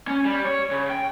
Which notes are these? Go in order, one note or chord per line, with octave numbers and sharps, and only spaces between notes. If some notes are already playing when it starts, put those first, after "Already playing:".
C#4
G3
C#5
C#3
G5